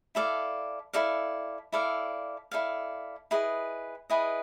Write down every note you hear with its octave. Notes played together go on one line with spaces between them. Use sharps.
E4 A4 D5 F5
E4 A4 D5 F5
E4 A4 D5 F5
E4 A4 D5 F5
E4 G#4 B4 D#5
E4 G#4 B4 D#5